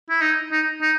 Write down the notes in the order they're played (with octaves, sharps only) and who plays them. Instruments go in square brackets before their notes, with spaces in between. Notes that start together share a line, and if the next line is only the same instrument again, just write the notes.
[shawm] E4
D#4
D#4
D#4